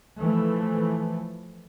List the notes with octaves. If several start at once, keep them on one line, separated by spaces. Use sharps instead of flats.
E3 F3 A3